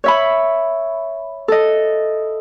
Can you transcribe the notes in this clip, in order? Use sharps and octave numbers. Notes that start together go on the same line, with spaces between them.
C#5 E5 B5
A4 D#5